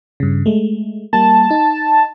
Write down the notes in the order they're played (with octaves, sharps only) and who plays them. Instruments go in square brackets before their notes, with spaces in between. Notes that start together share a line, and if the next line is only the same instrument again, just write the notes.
[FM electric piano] G2 C#3
G#3 A3
[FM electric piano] G3 A#3 [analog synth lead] A5
[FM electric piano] D#4